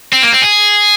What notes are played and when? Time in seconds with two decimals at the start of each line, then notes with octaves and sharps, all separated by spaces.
0.13 C4
0.22 A#3
0.32 C4
0.42 G#4